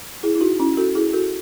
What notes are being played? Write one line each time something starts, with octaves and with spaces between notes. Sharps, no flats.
E4 G#4
E4
D#4 F#4
C#4 E4
F#4 A4
E4 G#4
F#4 A4